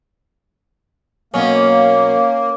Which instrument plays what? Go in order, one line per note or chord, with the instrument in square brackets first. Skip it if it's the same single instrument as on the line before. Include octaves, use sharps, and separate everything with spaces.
[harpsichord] B2 F#3 [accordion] A#3 [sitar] C#4